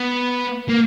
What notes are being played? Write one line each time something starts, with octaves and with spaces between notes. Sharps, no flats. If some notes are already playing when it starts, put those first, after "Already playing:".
Already playing: B3
A#3